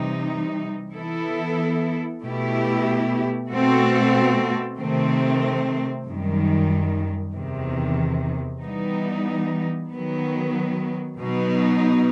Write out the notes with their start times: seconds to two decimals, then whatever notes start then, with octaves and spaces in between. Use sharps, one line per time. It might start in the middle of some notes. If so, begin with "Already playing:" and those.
Already playing: C3 E3 G3 D#4
0.94 E3 B3 E4 A4
2.22 B2 A3 E4 G4
3.50 B2 A3 C4 F#4 A4
4.78 C3 D#3 A3 C4
6.06 F#2 D#3 G3
7.35 E2 C3 D#3
8.63 E3 G3 B3 D#4
9.91 D#3 F#3 B3
11.19 B2 F#3 B3 D#4